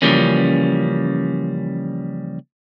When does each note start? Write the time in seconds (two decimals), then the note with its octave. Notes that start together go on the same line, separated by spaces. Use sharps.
0.02 C#3 E3 F3 G3 A#3 C#4